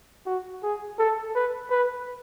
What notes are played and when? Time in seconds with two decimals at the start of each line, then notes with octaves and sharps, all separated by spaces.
0.26 F#4
0.63 G#4
0.99 A4
1.35 B4
1.70 B4